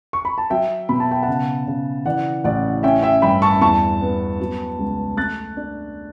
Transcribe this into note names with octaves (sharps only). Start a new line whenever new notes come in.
C#6
B5
A5
F#3 E5 G5
B2 B5
A5
G5
F#5 A5
C#3
C#3
E3 D5 F#5
A1 D5 F#5
C#4 E5 G5
E5 G5
G2 G5 B5
A5 C#6
E2 A5 C#6
B3
F#3
C#2
A3 F#6 A6
D4